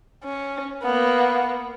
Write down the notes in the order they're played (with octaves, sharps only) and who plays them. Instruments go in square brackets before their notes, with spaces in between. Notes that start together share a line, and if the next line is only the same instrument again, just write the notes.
[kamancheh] C#4
A#3 B3